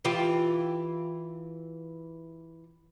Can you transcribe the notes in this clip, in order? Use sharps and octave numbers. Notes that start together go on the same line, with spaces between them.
E3 F4 G4